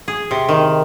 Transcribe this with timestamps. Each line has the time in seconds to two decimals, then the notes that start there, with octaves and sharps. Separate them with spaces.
0.08 G#4
0.31 C3
0.49 D#3